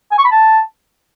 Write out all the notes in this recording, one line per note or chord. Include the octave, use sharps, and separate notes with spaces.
G#5
C#6
B5
A5